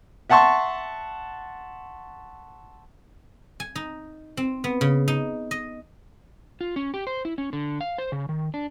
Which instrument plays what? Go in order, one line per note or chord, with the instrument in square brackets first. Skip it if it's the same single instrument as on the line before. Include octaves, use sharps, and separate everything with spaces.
[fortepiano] E5 F#5 A5 C6 C#6
[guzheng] G#5
D#4
C4
B3
C#3
D#4
D#5
[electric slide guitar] F4
C#4
G4
C5
E4
C#4
D3
F5
C5
C#3
D#3
D4